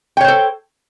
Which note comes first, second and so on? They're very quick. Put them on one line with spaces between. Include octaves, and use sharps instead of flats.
G5 C#5 C5 A4